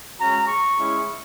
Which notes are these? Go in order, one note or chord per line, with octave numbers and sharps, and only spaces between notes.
G#3 C#4 F#4 A#5
C#6
G#3 C#4 E4